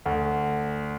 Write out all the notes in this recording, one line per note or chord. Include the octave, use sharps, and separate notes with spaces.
D2